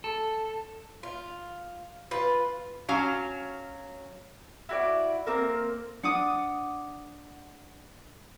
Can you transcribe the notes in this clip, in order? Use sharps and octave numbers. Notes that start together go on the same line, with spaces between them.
A4
F4
F4 B4
F#3 C#4 F5
E4 F#4 D5
A#3 C4 A#4
D4 F#5 D6 D#6